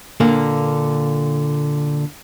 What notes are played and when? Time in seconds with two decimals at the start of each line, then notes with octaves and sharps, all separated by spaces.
0.20 A#2 D3 A#3